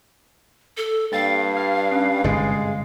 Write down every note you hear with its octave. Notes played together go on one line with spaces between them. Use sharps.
A4
G2 A#3 F5 G5 A6
F6 G#6
C#4
G1 G#2 C3 G#3 G#4